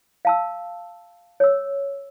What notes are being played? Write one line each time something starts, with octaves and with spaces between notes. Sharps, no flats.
F5 A5 E6
C#5 E6